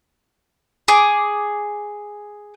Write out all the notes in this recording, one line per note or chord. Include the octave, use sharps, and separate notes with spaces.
G#4 D6